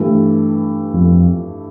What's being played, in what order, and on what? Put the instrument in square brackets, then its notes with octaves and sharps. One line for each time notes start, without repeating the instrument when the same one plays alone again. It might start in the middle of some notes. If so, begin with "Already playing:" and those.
Already playing: [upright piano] G2 E3 A3
[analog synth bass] F2